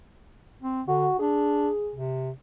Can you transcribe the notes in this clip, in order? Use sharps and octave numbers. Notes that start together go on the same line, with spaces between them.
C4
D3 F#4
D4 G#4
C3